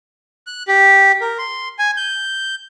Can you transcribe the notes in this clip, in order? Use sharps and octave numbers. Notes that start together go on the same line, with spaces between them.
F#6
G4
A#4
C6
G#5
G6